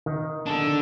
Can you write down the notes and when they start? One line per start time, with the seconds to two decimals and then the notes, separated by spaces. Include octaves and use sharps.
0.06 D#3
0.46 D4 A4